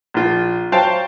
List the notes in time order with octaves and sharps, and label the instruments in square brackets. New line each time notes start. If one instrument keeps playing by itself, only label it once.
[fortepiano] A#1 F4
F#3 C5 F5 G5 A5